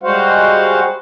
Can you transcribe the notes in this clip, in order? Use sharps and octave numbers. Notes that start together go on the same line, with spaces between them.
G3 G#3 F#4 C5 F5 F#5